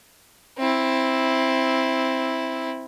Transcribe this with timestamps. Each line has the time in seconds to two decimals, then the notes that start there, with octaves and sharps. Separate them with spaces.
0.58 C4 E4